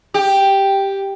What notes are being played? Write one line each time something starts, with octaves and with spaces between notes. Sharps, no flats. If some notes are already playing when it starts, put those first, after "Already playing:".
G4